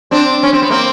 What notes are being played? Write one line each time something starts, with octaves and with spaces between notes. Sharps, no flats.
C4 D4
C#4
C4
B3
A#3 C4